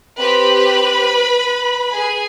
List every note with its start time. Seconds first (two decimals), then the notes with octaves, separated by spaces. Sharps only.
0.18 C4 G4 B4 B5
1.92 G#4 G#5